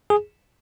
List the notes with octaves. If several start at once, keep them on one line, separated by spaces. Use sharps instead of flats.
G#4